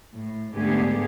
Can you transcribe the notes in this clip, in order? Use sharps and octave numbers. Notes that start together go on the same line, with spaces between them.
A2
G#2 D3 A3 B3 G4 G#4